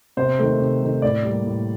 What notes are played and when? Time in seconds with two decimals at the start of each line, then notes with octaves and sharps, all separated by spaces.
0.17 C3 C5
0.39 D#3 A3
0.60 C3
0.82 D#3 A3
1.02 A2 D5
1.24 G3 A#3
1.45 A2